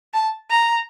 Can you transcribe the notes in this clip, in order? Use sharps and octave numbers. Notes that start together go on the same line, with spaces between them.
A5
A#5